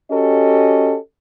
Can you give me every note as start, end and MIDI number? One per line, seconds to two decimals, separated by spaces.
0.12 0.97 61
0.12 0.97 66
0.12 0.97 67
0.12 0.97 69
0.12 0.97 75